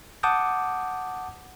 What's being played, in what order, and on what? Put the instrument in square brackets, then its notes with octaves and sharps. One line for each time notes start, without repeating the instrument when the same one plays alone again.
[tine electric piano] F#5 A5 D6 D#6 G6